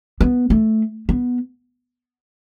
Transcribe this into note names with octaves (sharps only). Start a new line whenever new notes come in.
B3
A3
B3